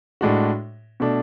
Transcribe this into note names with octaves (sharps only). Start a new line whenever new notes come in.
A2 G#3 D4 F#4
B2 A3 D4